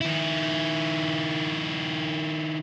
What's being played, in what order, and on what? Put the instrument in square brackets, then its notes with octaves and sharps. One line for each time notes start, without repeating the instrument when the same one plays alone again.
[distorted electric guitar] D#3 E4